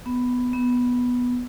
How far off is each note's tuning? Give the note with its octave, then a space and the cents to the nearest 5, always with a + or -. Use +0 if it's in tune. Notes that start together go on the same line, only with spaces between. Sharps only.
B3 +5
B3 -5